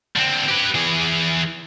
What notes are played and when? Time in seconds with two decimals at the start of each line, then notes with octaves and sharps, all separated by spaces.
0.16 D3 C4
0.48 G4 B4
0.75 E3 G#4